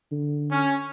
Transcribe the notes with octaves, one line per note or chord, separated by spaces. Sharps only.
D3
C#4